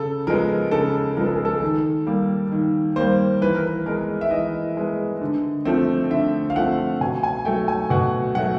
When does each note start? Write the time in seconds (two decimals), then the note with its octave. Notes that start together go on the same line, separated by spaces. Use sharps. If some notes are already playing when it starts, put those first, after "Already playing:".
Already playing: C#3 A4
0.27 F3 G#3 B3 A#4
0.71 C#3 A4
1.17 F3 G#3 B3 A#4
1.26 A4
1.36 G#4
1.45 A4
1.62 D#3
2.06 G3 A#3
2.52 D#3
2.96 G3 A#3 C5
3.42 E3 B4
3.55 A#4
3.67 B4
3.86 G#3 B3 A#4
4.21 E5
4.31 E3 D#5
4.77 G#3 B3
5.21 D3
5.65 F3 A3 C4
6.10 D3 E5
6.50 F5
6.56 F3 A3 C4 F#5
7.01 B2 G#5
7.23 G#5
7.45 F#3 A3 G5
7.68 G#5
7.90 B2 F#5
8.35 F#3 A3 F#5